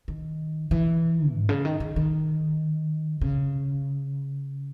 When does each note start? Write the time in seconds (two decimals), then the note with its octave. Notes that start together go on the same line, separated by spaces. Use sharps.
0.08 D#3
0.71 E3
1.33 G#2
1.49 C#3
1.65 D#3
1.80 D#3
1.96 D#3
3.21 C#3